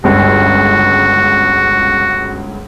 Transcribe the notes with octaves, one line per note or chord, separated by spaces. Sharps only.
G1 C#2 F#4